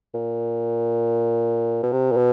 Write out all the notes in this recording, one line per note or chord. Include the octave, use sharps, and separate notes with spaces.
A#2
B2
C3
A#2
B2